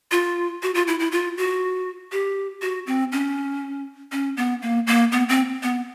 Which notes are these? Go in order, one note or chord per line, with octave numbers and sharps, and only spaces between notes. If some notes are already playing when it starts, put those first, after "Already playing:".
F4
F#4
F4
E4
E4
F4
F#4
G4
F#4
C4
C#4
C#4
B3
A#3
A#3
B3
C4
B3